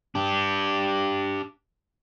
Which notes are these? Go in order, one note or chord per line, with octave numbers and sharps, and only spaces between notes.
D4 G4